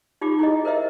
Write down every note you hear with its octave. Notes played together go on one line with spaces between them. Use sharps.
D#4 F4 G4 D6
E4 G#4 D#5
A#4 C5 D#5 E5